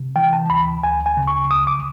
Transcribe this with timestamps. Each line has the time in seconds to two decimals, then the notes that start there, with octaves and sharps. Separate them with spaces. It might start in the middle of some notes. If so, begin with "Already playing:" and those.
Already playing: C3
0.16 E3 G5
0.33 A5
0.50 D2 B5
0.83 D2 G#5
1.06 G#5
1.17 C#3
1.27 C#6
1.51 C#2 D#6
1.67 D6